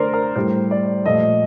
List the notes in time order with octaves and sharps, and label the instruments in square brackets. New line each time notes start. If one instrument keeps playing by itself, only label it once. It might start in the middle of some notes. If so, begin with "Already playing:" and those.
Already playing: [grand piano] D3 A3 A#4 C5 D5
A#4
A2 G3 C5
D5
A#2 F3 A3 D#5